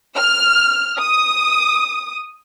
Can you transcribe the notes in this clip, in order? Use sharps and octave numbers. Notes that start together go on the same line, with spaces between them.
F6
D#6